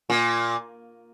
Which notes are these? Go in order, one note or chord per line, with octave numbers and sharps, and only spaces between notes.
A#2